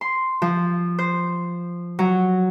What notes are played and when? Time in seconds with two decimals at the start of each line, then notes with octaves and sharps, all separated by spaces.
0.01 C6
0.42 F3
0.99 C5
1.99 F#3